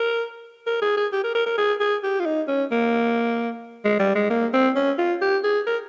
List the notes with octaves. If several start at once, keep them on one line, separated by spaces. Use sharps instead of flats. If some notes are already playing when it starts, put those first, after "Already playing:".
Already playing: A#4
A#4
G#4
G#4
G4
A#4
A#4
A#4
G#4
G#4
G4
F4
D#4
C#4
A#3
G#3
G3
G#3
A#3
C4
C#4
F4
G4
G#4
A#4